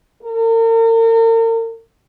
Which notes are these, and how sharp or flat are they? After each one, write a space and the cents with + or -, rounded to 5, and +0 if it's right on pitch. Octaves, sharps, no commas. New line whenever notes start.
A#4 -40